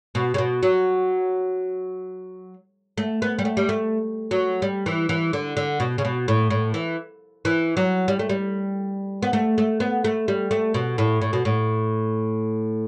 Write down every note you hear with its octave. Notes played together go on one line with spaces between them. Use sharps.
B2
C#3
B2
F#3
A3
B3
G3
A3
G3
A3
F#3
G3
E3
E3
D3
D3
B2
C#3
B2
A2
A2
E3
E3
F#3
G3
A3
G3
B3
A3
A3
B3
A3
G3
A3
B2
A2
A2
B2
A2